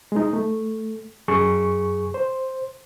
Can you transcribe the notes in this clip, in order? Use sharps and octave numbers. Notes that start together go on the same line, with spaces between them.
G#3 D#4
A3
F#2 G#4 C#6
C5